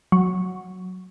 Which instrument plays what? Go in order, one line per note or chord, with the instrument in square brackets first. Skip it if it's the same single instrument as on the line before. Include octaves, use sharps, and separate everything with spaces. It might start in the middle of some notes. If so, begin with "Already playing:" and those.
[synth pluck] F#3